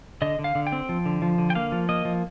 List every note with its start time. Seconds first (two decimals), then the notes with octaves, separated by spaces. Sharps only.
0.22 D3 D#5
0.39 D3
0.44 F5
0.55 D3
0.67 G5
0.72 C4
0.89 F3
1.06 D3
1.22 F3
1.38 D3
1.50 G5
1.55 A#3 F5
1.72 F3
1.89 A#3 D#5
2.05 F3